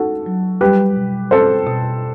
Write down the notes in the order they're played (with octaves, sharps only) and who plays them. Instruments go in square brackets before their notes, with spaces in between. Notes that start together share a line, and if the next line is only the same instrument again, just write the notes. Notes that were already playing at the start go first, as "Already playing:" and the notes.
Already playing: [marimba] D#4 [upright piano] F#4 A4
[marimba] F#3
[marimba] G3 [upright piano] G4 B4
[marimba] B2
[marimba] C4 [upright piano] A4 C5
[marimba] B2